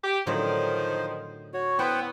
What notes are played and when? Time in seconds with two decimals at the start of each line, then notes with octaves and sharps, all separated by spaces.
0.03 G4
0.27 A2 D3 D#3 F3 F#3 C5
1.54 F#4 C#5
1.79 B3 E4 C5 C#5 F#5 G5